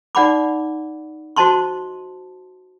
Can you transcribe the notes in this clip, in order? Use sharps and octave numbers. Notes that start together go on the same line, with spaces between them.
D#4 D5 F#5 B5 D6
F#4 C5 D#5 A5 C6 C#6